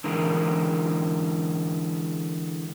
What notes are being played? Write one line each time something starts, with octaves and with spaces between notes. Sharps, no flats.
D3 E3 G#3 A#4